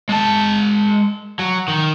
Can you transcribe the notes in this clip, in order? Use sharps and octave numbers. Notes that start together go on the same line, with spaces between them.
G#3 A5
F#3
D#3